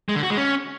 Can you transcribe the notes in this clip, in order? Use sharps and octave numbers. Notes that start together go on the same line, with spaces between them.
G#3
D3
F#4
G#3
C#4